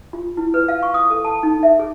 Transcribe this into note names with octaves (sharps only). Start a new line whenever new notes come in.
F4
E4
B4
F5
C#6
D#6
A4
A5
D#4
E5
G#4